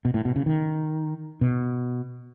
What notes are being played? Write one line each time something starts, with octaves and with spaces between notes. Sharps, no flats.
B2
A2
B2
C#3
D#3
B2